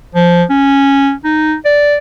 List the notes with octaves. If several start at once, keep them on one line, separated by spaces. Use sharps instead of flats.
F3
C#4
D#4
D5